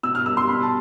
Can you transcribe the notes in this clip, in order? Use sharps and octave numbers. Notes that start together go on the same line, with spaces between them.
B2 E6
F6
G3 E6
C6
B2 B5
A5